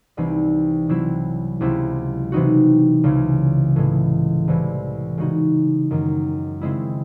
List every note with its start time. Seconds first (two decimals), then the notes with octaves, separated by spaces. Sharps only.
0.17 C2 C3 E3 C4 D#4
0.89 C3 F#3 C4 E4
1.61 C#2 C3 F#3 C4 E4
2.32 C3 E3 C4 D#4 F#4
3.04 C#2 C#3 E3
3.76 A2 E3 G#3
4.48 C2 C3 E3
5.18 C#3 G#3 D#4 F#4
5.91 F#2 D#3 G#3
6.61 C#3 G#3 C4 E4